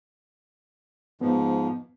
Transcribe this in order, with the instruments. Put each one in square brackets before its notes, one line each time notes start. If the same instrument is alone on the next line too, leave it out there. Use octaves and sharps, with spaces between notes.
[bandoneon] G#2 F3 [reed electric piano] B3